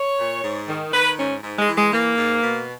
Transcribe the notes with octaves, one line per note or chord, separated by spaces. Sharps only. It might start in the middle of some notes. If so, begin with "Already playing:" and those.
Already playing: C#5
A#2
G#2
D#3
D#3 B4
G#2 C#4
G#2
G#3
E3
G#3
E3 A#3
G#2
B2